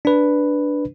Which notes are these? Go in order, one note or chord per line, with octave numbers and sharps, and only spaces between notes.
D4 B4